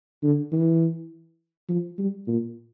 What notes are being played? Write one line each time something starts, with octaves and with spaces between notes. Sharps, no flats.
D3
E3
F3
G3
A#2